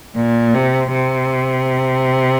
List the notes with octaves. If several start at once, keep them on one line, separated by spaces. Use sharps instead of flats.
A#2
C3
C3